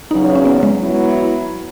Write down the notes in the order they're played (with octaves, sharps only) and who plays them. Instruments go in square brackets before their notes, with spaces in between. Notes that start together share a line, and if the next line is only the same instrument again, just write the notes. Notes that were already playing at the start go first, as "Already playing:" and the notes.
[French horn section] E2 C#3 F#3 [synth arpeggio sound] D#4
[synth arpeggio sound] C#4
B3
G#3
[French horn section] F#3 B3 E4